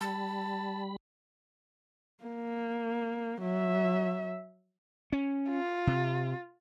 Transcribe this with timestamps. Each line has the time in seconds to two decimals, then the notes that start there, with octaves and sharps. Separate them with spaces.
0.01 G3 A5 B5
2.24 A#3
3.42 F#3 E5
5.12 C#4
5.50 F4
5.87 C3